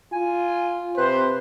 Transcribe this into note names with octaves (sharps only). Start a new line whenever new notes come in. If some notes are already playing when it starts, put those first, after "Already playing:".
F4 G#5
C3 B4 C5